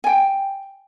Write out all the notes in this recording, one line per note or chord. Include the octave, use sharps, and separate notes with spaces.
G5 G#5